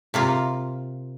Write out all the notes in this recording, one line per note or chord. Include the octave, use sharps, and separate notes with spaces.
C3 A#3 F4